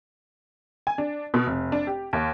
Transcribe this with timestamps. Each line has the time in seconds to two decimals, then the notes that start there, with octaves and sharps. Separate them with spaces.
0.87 G#5
0.98 D4
1.34 B2
1.47 F1
1.72 D4
1.87 G4
2.13 D#2